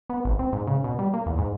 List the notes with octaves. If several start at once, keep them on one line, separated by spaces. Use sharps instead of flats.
B3
G#1
C4
G#2
C#3
B2
G3
A#3
E2
G#2